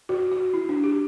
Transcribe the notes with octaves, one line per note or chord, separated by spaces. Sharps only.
F#4
F#4
E4
D4
G4